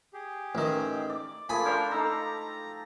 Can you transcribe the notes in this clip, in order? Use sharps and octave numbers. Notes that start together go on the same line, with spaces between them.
G4 G#4
A1 D#3
D5
F3 A3 A#3 G#4 G#5 B5
D4 G4 A#4 C5 F5
D#4 A4 F5 A#5